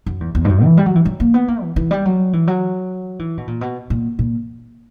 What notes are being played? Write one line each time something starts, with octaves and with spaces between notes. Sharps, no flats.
F#2
E2
E2
G2
F#2
E3
G3
F#3
E3
F#3
A#3
B3
A#3
E3
E3
G3
F#3
E3
F#3
E3
B2
A#2
B2
A#2
A#2